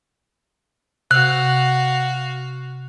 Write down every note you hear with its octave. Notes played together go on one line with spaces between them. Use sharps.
C3 F#4 F5 F#6